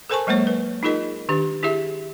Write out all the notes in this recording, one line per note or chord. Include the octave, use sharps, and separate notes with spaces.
A4 A#4 C5 G#5 A5 C#6
F#3 G#3 A#3 C5 C#5
B4
D#4 F4 G#4 A#4 D#5
D#3 D4 G4
E4 G4 G#4 E5